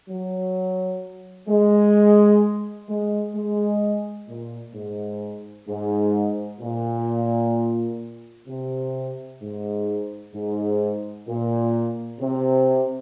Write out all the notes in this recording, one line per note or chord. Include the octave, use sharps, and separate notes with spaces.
F#3
G#3
G#3
G#3
A#2
G#2
G#2
A#2
C3
G#2
G#2
A#2
C3